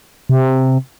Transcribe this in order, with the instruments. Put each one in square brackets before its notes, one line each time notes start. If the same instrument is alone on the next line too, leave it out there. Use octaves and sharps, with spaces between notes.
[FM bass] C3